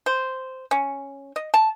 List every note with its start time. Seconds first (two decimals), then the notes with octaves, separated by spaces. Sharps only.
0.06 C5
0.71 C#4
1.36 D#5
1.54 A5